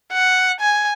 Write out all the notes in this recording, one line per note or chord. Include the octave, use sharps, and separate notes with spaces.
F#5
G#5